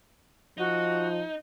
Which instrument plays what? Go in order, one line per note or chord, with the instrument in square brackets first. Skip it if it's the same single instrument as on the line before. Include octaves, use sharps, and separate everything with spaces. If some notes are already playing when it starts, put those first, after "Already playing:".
[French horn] F3 [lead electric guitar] D#4 [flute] F#4